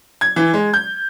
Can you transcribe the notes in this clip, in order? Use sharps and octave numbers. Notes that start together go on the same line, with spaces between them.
G#6
E3
G#3
G6